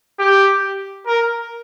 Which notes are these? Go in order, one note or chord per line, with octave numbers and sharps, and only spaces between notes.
G4
A#4